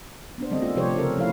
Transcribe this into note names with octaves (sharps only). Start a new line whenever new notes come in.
B3 D4 C5
D3 D#3 G3 A3 C4 D#5
F4 A4
C3 F3 A3 G4 C5 C#5
C#3 A3 C#4 A4 A#4
F3 A3 E4 C#5 F5